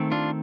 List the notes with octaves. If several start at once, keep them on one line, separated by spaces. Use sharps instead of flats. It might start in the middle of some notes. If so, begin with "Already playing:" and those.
Already playing: D#3 A3 C4
D4 F4